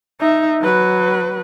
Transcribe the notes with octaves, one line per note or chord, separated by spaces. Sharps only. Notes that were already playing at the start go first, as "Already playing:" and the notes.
D#4 E5
F#3 B4